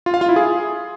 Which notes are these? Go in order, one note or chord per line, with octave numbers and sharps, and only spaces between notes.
F4
F5
F4
E4
G#4